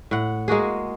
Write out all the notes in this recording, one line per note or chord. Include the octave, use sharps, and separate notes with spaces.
A2 F#5
G#3 A#3 F#4 G#4